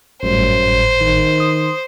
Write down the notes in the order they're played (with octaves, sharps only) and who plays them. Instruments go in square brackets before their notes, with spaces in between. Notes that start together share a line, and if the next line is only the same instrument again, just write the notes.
[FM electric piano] G#1 A2 G3 [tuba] F#2 [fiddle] C5
[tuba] D#3
[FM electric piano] C6 D#6